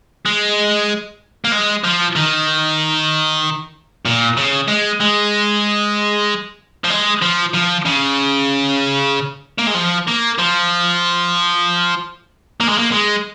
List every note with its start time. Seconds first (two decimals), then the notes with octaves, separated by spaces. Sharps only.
0.26 G#3
1.45 A#3
1.52 G#3
1.84 F3
2.16 D#3
4.05 A#2
4.37 C#3
4.68 G#3
5.00 G#3
6.85 F3
6.90 G#3
7.22 F3
7.54 F3
7.86 C#3
9.59 A#3
9.68 G#3
9.75 F3
10.07 A#3
10.39 F3
12.60 A#3
12.69 G#3
12.78 A#3
12.92 G#3